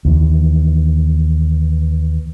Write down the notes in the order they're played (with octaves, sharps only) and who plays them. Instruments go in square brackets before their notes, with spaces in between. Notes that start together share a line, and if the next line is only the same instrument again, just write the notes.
[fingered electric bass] D#2 E3